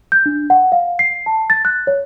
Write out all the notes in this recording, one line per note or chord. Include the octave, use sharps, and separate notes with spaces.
G6
D4
F#5
F5
C7
A5
A6
F#6
C#5